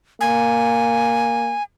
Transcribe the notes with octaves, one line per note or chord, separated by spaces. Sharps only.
A#3 G#5